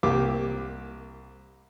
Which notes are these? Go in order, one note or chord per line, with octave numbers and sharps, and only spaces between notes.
C2 A#3 G4 D6